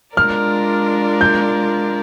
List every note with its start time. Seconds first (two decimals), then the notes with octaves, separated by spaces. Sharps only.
0.16 G#3 D4 F4 A#4 D5 F6
1.21 G6